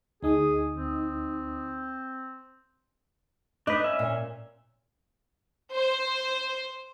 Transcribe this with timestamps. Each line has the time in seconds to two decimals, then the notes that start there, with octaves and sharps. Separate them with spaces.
0.23 D2 D#4 G#4 D#6
0.75 C4
3.67 D4 D#4 B4 D#5
3.84 C#4 E5
3.99 A#2
5.74 C5